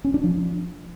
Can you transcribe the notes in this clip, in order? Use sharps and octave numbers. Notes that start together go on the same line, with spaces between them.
C#4
D4
F3